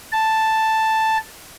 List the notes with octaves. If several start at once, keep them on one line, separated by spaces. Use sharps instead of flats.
A5